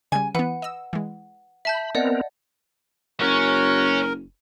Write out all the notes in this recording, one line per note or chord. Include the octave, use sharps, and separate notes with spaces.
C#3 G3 G#5
E3 B3 B4 F#5
D#5 E6
E3 G#3
E5 A5 B5 G6
B3 C4 A#4 D5 D#5 F#5
F#1 C#4 F#4 A#4